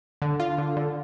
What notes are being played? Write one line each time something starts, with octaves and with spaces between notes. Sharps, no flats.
D3
F4
D3
D3